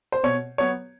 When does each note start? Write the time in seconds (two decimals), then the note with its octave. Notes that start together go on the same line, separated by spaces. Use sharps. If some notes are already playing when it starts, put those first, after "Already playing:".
0.12 C5
0.23 B2 C#5
0.58 F#3 B3 C#5